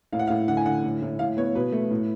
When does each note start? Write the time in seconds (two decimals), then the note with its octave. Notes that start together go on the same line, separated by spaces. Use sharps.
0.13 A2 F5
0.19 F#5
0.27 F5
0.30 A2
0.48 D3 F#5
0.57 G#5
0.66 D3 F#5
0.84 A2
1.02 A2
1.19 A2 F5
1.37 B3 C#5
1.55 B2 B4
1.72 A3
1.91 A2